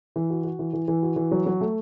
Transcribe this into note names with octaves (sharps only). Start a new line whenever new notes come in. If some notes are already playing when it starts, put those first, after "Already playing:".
E3
F#4
F#4
E3
E3
E3
F#4
E3
F#3
F#3
A3